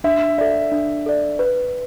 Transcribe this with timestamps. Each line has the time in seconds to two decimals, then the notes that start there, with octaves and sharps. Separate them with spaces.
0.04 D4 E5
0.38 A4 D5 E5
0.72 D4
1.06 A4 D5
1.39 B4